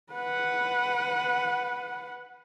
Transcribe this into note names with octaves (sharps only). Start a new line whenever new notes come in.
B4 F#5